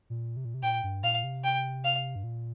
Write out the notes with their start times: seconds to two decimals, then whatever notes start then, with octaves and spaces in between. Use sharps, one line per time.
0.10 A#2
0.37 C3
0.45 A#2
0.54 C3
0.63 A#2 G5
0.83 G2
1.03 A#2 F5
1.24 C3
1.44 G5
1.84 F5
2.16 G2
2.24 A#2